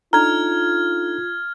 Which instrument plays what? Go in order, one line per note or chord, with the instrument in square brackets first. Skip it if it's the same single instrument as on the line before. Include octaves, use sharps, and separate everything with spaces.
[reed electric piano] D4 D#4 A4 [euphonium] F4 [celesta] A#5 [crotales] F6 G#6